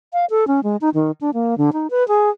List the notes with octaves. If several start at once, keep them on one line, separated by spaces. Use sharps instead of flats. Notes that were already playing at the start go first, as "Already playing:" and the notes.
F5
A4
C#4
G#3
D#4
D#3
D4
A#3
D3
D#4
B4
G#4